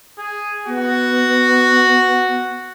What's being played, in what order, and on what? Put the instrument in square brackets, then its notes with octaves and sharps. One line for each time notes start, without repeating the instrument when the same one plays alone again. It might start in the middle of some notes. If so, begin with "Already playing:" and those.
[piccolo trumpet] G#4
[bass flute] B3 [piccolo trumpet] F#4